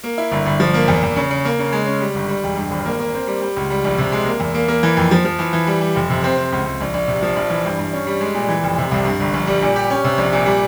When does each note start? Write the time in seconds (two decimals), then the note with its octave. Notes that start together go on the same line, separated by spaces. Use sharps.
0.04 A#3
0.18 E4
0.32 G1
0.46 G1
0.60 F3
0.74 A#3
0.88 E2
1.03 E2
1.16 C#3
1.31 C#3
1.45 A#3
1.59 C#3
1.72 G#3
1.86 C#4
2.01 G3
2.15 G1
2.29 G3
2.43 E1
2.57 G2
2.71 G#1
2.86 A#3
2.99 A#3
3.14 C4
3.27 G3
3.42 G3
3.56 C#2
3.70 G3
3.84 A#1
3.98 C3
4.12 G#3
4.26 A#3
4.40 E2
4.54 A#3
4.68 A#3
4.83 E3
4.97 F2
5.11 F3
5.25 F3
5.39 E3
5.53 E3
5.67 G3
5.81 G3
5.96 F1
6.10 C3
6.24 C4
6.38 C4
6.52 C#2
6.65 C#2
6.81 A#1
6.94 A#1
7.08 C3
7.22 F3
7.36 A#1
7.50 E3
7.65 G2
7.79 G2
7.93 C#4
8.07 G3
8.20 G#3
8.34 A#2
8.49 E3
8.63 F1
8.78 C3
8.91 C2
9.05 G2
9.20 G1
9.34 A#1
9.47 G3
9.62 A#2
9.76 G4
9.90 C#4
10.04 C3
10.18 A#1
10.33 A#2
10.46 G3